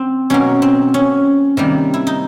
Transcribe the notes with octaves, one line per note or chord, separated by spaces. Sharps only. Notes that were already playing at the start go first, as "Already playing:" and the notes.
Already playing: C4
B2 F#3 A#3 C#4
C4
C#4
C3 D#3 G3 A#3
E4
D#4